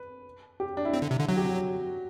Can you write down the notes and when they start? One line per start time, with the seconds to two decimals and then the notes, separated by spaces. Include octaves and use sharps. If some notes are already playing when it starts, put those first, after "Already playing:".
Already playing: B4
0.60 G4
0.77 D4
0.85 E4
0.94 C4
1.02 D3
1.11 C3
1.20 D3
1.29 F#3 F#4
1.37 G4
1.46 F#4